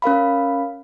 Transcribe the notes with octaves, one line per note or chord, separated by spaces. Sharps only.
C#4 A#4 F5 B5